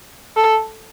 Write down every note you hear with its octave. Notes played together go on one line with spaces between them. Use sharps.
A4